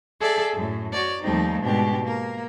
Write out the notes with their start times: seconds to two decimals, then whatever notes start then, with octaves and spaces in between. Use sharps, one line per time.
0.19 G#4 A4 D5 E5
0.54 F#2 A2
0.92 F#4 C#5 D5
1.21 D#2 F3 G3 A3 C4 D#4
1.61 G#2 B2 D4 G4
2.03 A#3 A#4